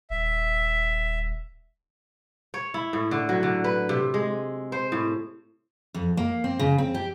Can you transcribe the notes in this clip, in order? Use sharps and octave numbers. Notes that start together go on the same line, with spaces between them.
D#1 E5
C#5
E4
A2
D3
F#3
D3
B4
C3
G#3
C5
A2
F2
A#3
C4
C#3
C4
G4